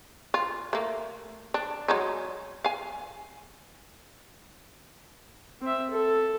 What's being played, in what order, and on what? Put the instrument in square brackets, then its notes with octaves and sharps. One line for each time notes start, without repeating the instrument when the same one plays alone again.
[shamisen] F4
A3 A#3
D4
F#3 G#3 D#4
F5 G#5
[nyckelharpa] C4 E5
A4